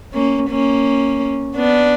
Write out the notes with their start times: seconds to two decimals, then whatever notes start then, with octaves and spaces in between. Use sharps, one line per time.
0.14 A#3 C#4
0.50 A#3 C#4
1.56 B3 D4